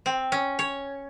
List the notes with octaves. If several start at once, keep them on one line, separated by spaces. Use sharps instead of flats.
C4
C#4
C#5